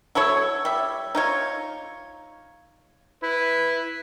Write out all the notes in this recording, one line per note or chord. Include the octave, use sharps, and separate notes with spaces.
F#3 E4 A4 C#5
G3 E5
D#4 F4 C#5
E4 B4